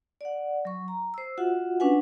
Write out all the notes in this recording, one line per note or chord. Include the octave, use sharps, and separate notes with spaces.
D5 F#5
F#3 C#6
A#5
C5 E6
F4 F#4 E5 F#5
C#4 D4 B4 F#5 G#5